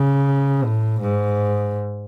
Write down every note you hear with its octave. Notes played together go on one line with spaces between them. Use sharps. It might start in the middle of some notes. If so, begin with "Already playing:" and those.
Already playing: C#3
A2
G#2